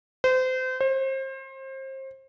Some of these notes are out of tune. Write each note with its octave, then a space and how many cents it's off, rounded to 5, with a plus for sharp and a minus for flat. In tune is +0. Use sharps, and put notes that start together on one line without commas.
C5 -30
C5 +30